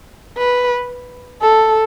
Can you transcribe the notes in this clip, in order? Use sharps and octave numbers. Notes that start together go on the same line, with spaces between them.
B4
A4